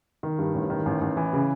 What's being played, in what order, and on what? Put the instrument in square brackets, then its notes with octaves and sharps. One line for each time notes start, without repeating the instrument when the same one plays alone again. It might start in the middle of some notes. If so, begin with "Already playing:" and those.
[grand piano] D#3
G2
A1
D#3
A1
A1
E3
C#3